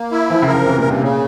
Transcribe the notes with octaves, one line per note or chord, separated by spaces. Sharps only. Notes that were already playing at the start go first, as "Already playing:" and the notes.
Already playing: A#3
E4
E3 F3
C#3
A#4
C#3
C3 E3
A#2
G2
C3
A#2 C#3